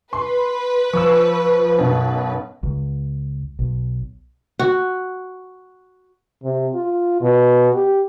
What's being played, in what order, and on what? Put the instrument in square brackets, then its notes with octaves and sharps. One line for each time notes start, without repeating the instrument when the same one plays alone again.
[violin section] B4 [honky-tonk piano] C6
[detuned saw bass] F3 [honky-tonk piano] C#6 E6
[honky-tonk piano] B1 F#2 B2
[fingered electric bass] C#2
B1
[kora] F#4
[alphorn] C3
F4
B2
G4